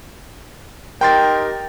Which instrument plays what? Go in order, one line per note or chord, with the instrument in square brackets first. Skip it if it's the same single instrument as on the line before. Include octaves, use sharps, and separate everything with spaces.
[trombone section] D#4 G4 A#4 [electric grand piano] G5 C6 A6